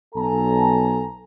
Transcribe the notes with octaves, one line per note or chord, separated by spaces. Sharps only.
B1 A4 G#5 A#5